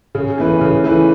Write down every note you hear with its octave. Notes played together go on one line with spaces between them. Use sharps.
C#3
E3 A3 E4 B4
C#3
E3 A3 E4 B4